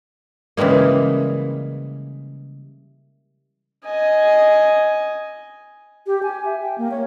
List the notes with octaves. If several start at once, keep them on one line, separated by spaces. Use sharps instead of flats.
C#3 E3 G3 G#3 A#3
D#5 G#5
G4
G#5
E5
G5
A#3
C#5